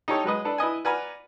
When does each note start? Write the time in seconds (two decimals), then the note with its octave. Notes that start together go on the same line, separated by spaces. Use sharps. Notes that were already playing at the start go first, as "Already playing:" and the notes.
0.08 D#4 G4 A4 C#5
0.24 F#3 G#3 B4 D#5
0.45 D4 A4 B4
0.58 E4 B4 D#5 G#5
0.85 B4 D5 F#5 G#5 A#5 F6